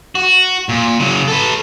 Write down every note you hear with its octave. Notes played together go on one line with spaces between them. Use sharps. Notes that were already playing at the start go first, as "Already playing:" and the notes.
F#4
A#2
C#3 F#3
A4 B4